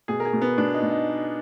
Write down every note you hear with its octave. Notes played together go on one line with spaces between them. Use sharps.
B2 G#4
A#4
G#4
B2
B3
B2 D4
D#4
B2
D#4